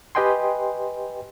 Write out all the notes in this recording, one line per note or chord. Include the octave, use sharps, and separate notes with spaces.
G4 B4 D#5 G5 G#5 C6